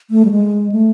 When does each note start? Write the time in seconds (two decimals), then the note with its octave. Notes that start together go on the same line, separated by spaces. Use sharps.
0.10 A3
0.25 G3
0.31 G#3
0.72 A3